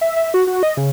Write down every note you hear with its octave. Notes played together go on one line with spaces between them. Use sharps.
E5
E5
F#4
F#4
D#5
C#3